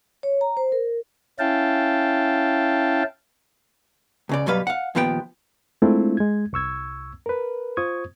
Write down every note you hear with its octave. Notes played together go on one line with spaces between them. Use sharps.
C#5
A#5
C5
A#4
C#4 E4 F5 G5 A5
C#2 C#3 D5
F#2 B2 F#3 G3 B4 F5
F5 F#5
D#2 A#2 F3 B3 G4 G5
G#3 A3 C4 D4 E4 F4
G#3 G#6
C2 C#6 E6 G#6
A#4 B4
F4 C5 C#6 D#6 G#6